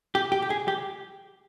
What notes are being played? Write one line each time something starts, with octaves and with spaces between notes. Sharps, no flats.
G4
G4
G4
G#4
G4